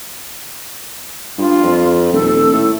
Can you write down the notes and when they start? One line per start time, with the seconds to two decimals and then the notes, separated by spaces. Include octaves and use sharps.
1.38 G2 F4
1.63 F2
2.13 D#1 A4
2.53 A2